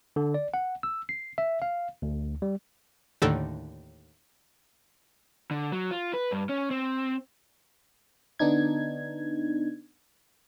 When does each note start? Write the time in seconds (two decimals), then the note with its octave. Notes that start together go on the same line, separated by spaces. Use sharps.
0.16 D3
0.34 D5
0.54 F#5
0.83 E6
1.09 C7
1.38 E5
1.62 F5
2.02 D2
2.42 G3
3.22 D#2 A2 D3 D#3 A4
5.51 D3
5.72 F#3
5.91 F4
6.13 B4
6.32 G2
6.49 C#4
6.71 C4
8.39 D3 B3 D4 D#4 G#6